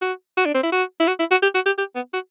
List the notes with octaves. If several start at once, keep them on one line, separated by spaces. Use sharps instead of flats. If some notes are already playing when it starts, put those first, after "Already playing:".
F#4
F#4
D4
C4
E4
F#4
E4
F#4
E4
F#4
G4
F#4
G4
G4
B3
F#4